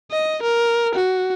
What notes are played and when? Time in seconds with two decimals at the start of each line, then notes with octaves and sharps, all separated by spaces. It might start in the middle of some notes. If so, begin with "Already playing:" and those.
0.11 D#5
0.43 A#4
0.95 F#4